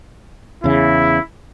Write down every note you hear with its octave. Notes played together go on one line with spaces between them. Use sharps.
E2 C#3 E4